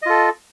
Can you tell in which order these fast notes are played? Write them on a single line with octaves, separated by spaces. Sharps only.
D#5 F4 A4